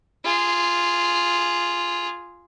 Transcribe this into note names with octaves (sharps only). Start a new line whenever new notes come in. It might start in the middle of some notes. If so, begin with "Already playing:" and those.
F4 G#4